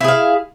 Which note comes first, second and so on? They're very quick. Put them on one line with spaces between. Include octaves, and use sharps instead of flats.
E4 G#4 F5